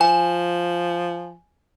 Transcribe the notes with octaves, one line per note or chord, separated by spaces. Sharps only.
F3 G#5